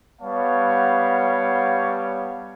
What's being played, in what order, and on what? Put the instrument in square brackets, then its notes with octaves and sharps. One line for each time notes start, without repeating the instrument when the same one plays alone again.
[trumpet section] G3 B3 C#5 F5 F#5 A5